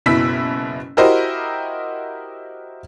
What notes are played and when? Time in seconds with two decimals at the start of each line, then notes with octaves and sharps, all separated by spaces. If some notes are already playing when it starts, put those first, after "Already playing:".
0.06 F#1 B2 E4 E6 B6
0.97 E4 F#4 G4 A#4 C5 D#5